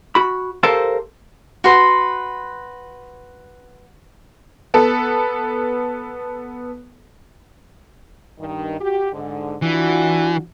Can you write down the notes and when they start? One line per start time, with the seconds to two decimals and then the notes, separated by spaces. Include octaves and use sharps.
0.15 F#4 B5
0.63 G4 A4 A#4 C5 F5 A5
1.64 F#4 B4 C6
4.74 B3 A4
8.39 G2 D#3
8.80 F#4 G4
9.13 G#2 D3
9.62 E3 D4 F4 F#4